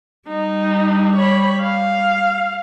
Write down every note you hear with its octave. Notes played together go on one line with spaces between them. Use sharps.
G3 D#4
C#5 B5
F5